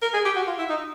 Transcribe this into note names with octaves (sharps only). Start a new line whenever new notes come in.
A#4
G#4
G4
F#4
F4
E4
D#4